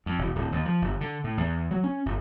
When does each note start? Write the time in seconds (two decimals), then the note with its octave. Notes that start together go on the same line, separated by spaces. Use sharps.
0.06 F2
0.18 E1
0.35 D1
0.52 D#2
0.65 F3
0.82 G1
1.01 D3
1.24 A2
1.37 E2
1.71 F#3
1.84 C#4
2.06 G1